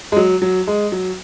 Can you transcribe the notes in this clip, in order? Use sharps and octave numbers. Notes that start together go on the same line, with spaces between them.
G#3
F#3
F#3
G#3
F#3